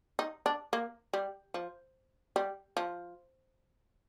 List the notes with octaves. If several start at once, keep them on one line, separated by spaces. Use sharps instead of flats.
D#4
D4
A#3
G3
F3
G3
F3